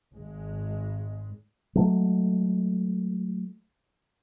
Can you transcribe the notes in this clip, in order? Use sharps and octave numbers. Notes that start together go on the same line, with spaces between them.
G#1 G#3
F#3 G#3 A3